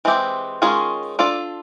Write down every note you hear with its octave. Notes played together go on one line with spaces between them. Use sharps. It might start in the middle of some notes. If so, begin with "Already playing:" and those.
E3 G#3 C4 E4 G4
D#3 G#3 C#4 F4 G#4
D4 F4 A4 D5